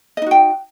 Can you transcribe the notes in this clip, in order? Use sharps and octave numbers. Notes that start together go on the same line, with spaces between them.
D#4 F#4 D#5 G5